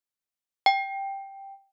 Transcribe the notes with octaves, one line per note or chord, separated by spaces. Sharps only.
G5